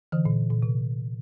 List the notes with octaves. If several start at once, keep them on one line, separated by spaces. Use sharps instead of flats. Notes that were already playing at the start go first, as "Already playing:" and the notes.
D3 E3
A#2
A#2
C3